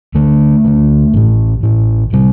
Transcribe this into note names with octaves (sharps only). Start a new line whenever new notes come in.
D2 D3 A3
D2 D3
A1 A2
A1 A2
C3 G3